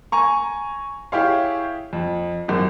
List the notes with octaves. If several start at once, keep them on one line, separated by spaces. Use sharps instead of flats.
G#5 A#5 C#6
E4 G4 G#4 C#5 F5
F2
G#1 F#2